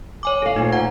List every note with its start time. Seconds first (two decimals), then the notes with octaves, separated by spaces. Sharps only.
0.23 C#5 G#5 D6
0.42 F#2 A4 F5
0.56 D2 A#2 D#4
0.72 F#5 A#5 G#6